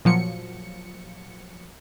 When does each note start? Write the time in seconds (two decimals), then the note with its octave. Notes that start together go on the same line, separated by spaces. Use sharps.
0.05 A#2 F3 F#3 C#7